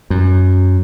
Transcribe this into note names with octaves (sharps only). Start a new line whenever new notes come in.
F#2